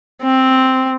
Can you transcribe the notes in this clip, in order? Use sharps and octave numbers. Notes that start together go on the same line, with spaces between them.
C4